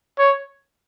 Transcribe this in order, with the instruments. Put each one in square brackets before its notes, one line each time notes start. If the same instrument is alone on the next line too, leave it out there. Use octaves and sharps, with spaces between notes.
[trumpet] C#5